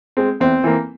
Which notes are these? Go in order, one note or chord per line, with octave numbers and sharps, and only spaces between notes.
G#3 C4
E2 C4
E3 A#3